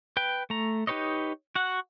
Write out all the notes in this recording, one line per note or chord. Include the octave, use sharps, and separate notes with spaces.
B4 G5
A3 A#5
D#4 G4 B4 C#5 D#5
F#4 F#5